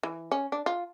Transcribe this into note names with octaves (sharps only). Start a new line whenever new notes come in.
E3
C#4
D4
F4